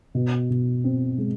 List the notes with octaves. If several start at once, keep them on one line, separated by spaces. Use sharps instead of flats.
B2
B2
C4
G#3